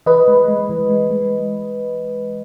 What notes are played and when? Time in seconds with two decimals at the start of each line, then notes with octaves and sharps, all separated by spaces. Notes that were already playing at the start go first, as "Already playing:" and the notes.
0.06 E3 B4 D#5
0.28 G#3
0.48 G#3
0.69 E3
0.90 G#3
1.11 G#3